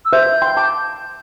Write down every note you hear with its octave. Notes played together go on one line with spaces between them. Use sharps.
E6
C5 E5 G6
G5 C6
A5 D6